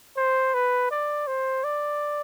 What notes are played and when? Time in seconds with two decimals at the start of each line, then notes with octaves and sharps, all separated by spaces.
0.17 C5
0.54 B4
0.91 D5
1.27 C5
1.64 D5